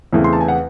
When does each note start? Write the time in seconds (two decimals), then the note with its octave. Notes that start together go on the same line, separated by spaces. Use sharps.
0.13 E2 C#3 E3 A3 C4
0.24 C6
0.33 A5
0.41 G#5
0.48 F#5